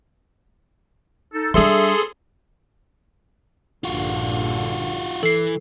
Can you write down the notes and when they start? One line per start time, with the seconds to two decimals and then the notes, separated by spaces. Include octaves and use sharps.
1.33 D#4 A4
1.54 G3 D4 G#4 A4 E5 C6
3.84 A#1 G2 D3 F4 F#4
5.23 E3 A4 C7